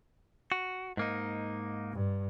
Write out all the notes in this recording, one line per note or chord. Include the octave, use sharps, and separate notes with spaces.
F#4
G#2 A#3 D#4
G2